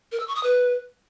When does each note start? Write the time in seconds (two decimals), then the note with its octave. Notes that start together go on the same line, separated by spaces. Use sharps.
0.12 A#4
0.20 E6
0.28 C#6
0.36 D#6
0.43 B4